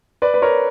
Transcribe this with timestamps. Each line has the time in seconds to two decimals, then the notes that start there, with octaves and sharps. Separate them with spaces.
0.22 B4 D5
0.34 B4
0.42 A#4 C#5